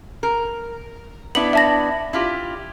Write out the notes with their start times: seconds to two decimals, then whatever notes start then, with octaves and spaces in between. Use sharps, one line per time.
0.23 A#4
1.35 B3 D4 E4 F#7
1.53 E5 A5 A#6
2.13 E4 F4 G4